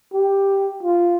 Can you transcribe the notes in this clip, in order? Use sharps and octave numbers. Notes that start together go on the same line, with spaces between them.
G4
F4